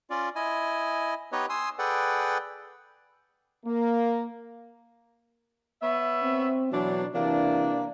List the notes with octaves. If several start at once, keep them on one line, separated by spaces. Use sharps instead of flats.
C#4 F4 D5
E4 D#5 G#5
B3 D#4 G4 B4 C#5 D#5
G#5 C6 D#6 E6
G#4 A4 B4 D5 F#5 G5
A#3
B3 C#5 E5
C4
B2 E3 F#3 D4
C3 E3 A#3 D4